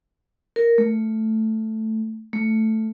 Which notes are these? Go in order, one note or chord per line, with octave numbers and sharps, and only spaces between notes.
A#4
A3
A3